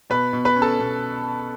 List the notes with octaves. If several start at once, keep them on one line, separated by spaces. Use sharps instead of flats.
B2 B4 B5
B2
B4 B5
C#4
A4 A5
B2